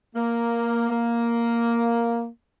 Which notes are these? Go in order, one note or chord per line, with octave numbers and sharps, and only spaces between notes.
A#3
A#3